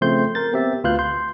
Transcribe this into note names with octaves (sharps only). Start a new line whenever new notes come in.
C#3 F3 A3 C4 C6 G6
A#4 G6 A6
B3 C4 G4 E5
D2 F4 B4 F5 F#6 G6
C6 G6